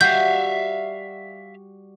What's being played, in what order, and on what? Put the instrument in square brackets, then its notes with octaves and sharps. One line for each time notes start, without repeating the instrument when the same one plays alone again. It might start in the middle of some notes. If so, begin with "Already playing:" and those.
[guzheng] G3 F#4 [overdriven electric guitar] E5 F5 [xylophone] G6